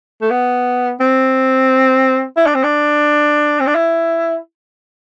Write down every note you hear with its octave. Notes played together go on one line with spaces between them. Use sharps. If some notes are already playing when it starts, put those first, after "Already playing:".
A3
B3
C4
E4
D4
C4
D4
C4
D4
E4